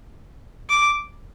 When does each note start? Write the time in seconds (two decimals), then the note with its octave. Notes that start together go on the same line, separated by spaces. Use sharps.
0.70 D6